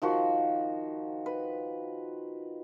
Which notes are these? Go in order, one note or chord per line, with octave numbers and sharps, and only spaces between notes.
D#3 F3 F#4
B4